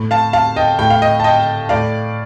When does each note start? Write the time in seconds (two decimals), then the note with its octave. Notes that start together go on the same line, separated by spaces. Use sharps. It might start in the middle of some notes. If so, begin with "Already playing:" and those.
Already playing: A2
0.11 F5 A5
0.33 F5 A5
0.56 D#5 G5
0.78 A2 G5
0.90 F5
1.02 D#5 G5
1.20 A5
1.24 D#5 G5
1.69 A2 D5 F5